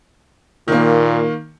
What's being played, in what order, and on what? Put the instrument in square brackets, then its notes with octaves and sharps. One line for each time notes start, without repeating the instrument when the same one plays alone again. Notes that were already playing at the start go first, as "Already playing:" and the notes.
[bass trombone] A#2 [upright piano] D#3 A#3